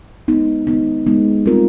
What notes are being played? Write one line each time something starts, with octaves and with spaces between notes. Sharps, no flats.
G#3 B3 D#4
G#3 B3 D#4
G#3 B3 D#4
G3 C4 F4 A#4